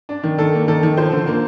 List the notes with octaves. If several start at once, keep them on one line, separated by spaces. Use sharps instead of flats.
D4
D#3
D#3 A4
A#3
D#3 A4
D#3
F3 C5
D3
A#3